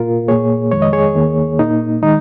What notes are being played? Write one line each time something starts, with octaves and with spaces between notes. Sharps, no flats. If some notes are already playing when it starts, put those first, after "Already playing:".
Already playing: A#2 A#3 F4 A#4
A#2 A#3 G#4 C#5
F2 D#3 G#3 C#5
D#5
G#4 C#5
D#2 D#3 A#3
A#2 A#3 D#4
D#3 G#3 D#4